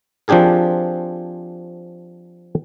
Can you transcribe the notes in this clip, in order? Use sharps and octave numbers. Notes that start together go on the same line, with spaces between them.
F3 C4 D4 G4 G#4 A#4